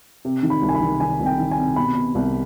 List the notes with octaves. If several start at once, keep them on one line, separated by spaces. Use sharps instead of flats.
C3
D#3
B5
C2
G#5
B5
D#3
D#3 G#5
C2
G5
D#3
G#5
C3
B2 B5
B2
C2